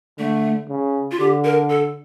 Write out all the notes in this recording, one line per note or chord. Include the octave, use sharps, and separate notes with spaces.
D3 A3
C#3
F4
D3 G4
A#4
A4